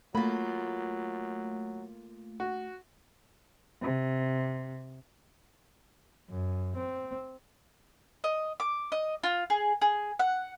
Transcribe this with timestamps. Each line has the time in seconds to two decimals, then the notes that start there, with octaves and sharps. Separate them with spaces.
0.15 F#3 A3 A#3 F4 B5
2.40 F#4
3.82 C3
6.30 F#2
6.76 C4
8.24 D#5
8.60 D6
8.92 D#5
9.23 F4
9.50 G#4
9.82 G#4
10.19 F#5